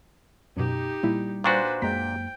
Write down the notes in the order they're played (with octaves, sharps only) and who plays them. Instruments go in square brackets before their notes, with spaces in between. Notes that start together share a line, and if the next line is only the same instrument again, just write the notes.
[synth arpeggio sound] F#2 B2 [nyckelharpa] D#4 G4
[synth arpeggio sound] A#2 A#3 E4 [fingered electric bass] G3
[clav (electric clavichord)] A#2 D4 F#4 [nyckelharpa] B4 C5 [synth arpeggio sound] G5 C#6
[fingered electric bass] F#2 A#3 [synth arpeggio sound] G#3 A#5 B6 [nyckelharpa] G5